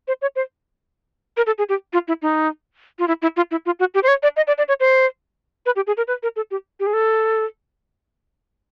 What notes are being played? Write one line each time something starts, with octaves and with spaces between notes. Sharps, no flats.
C5
C#5
C5
A#4
A4
G#4
G4
F4
E4
D#4
F4
E4
E4
F4
E4
F4
F#4
G4
C5
C#5
D5
D#5
D5
D5
C#5
C5
B4
G4
G#4
A#4
B4
A#4
A4
G4
G4
G#4
A4